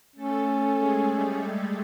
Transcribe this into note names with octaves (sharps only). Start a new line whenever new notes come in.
A3 C#4 A4
G#3 G#4
G3 G4